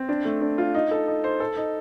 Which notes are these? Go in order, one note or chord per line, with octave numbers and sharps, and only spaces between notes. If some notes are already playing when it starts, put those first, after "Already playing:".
Already playing: C4
D4
A3
D4
F4
D#4
A4
D#4
C5
A4
D#4